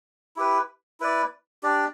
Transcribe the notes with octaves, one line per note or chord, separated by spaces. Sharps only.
E4 G4 B4
E4 B4 D5
D4 G4 D5